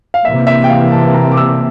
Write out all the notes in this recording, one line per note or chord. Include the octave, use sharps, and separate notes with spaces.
F5
C3 E3 A#3 E5
E5
G5
F5
A5
A#5
D6
E6